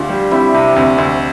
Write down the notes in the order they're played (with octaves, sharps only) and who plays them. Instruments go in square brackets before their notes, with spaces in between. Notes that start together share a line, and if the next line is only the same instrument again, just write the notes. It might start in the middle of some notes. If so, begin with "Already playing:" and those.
Already playing: [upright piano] D2 [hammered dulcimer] D4 F4 G4
[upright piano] G3
[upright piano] G3 [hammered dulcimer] C4 E4
[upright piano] C3
[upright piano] D2 [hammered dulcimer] C4
[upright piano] D2